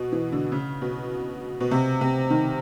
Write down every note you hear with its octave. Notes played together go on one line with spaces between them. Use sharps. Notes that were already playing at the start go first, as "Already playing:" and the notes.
Already playing: B2
E3
D3
C#3
B2
B2
C3
C3
D#3